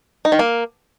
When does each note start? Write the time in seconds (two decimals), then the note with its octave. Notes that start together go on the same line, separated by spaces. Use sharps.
0.25 D#4
0.32 D#3
0.39 A#3